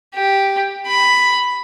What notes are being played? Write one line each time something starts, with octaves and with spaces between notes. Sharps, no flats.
G4
B5